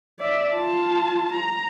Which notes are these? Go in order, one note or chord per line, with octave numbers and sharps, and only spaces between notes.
D5 E5
F4 A5
A#5